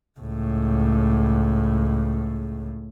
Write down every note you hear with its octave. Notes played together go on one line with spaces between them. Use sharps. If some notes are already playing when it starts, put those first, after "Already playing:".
C#2 A2